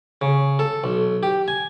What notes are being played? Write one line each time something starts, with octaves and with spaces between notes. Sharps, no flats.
C#3
A4
B1
G4
G#5